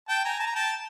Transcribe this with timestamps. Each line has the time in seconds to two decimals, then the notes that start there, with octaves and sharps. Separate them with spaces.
0.08 G5 A5
0.25 G#5 A#5
0.40 A5
0.47 A#5
0.55 G5 A5